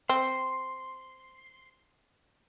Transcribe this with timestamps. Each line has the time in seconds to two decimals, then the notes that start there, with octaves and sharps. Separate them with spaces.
0.09 C4 C6